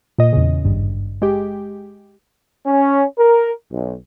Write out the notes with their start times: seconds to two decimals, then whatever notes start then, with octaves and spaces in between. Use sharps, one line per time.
0.18 A#2 D#5
0.33 E2 C#3
0.64 G#1 G2
1.22 G#3 G4
2.66 C#4
3.18 A#4
3.71 B1